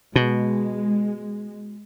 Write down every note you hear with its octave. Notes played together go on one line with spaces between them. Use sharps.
B2 G#3